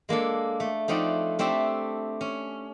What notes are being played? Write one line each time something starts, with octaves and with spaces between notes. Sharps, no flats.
G#3 A#3 D4 A4
A3
F3 A3 C4 D#4 D5 F#5
A3 C4 D4 G4 E5
C#4